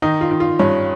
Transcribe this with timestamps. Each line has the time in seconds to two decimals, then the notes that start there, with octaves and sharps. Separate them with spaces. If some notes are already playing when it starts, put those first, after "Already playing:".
0.02 D#3 D#4
0.21 F4
0.31 D#3
0.40 F4
0.59 G2 C#4